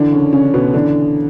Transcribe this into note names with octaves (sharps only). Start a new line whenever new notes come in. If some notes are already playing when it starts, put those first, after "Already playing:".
Already playing: F#2 D3 E3 D4
C#3 C#4
C#3 C#4
C#4
B2 B3
D3 E3 D4